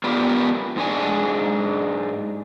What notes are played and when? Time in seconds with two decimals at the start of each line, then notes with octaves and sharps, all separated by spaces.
0.04 B3 F4 G4 A#4 B4 D5
0.76 G#2 G#3 D4 G#5